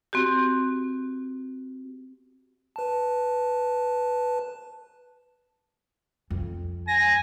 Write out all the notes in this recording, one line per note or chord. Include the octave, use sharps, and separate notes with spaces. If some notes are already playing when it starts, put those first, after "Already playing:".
C4 F#4 G4
B4 A5
F2
G#5 A#6